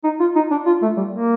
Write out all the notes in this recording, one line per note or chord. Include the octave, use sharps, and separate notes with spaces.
D#4
F4
D#4
D4
F4
A3
G3
A#3